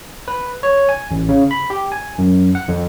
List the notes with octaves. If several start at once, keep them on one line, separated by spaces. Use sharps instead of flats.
B4
C#5
G#5
A1
C#3
B5
G4
G#5
F#2
F#5
F2